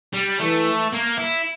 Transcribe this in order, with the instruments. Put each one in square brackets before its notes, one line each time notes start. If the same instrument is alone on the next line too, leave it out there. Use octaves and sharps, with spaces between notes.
[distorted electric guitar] G3
[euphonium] E3 [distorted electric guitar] A3
[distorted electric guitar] A#3
E4